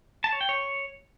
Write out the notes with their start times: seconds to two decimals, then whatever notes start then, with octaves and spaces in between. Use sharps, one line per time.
0.24 A5
0.32 C#5
0.41 G5
0.49 C#5